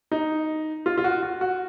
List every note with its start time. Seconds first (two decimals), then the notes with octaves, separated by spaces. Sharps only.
0.12 D#4
0.86 F4
0.98 F4
1.04 F#4
1.23 F#4
1.41 F#4